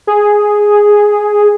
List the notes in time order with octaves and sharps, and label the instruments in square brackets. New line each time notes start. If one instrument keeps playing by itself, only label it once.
[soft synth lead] G#4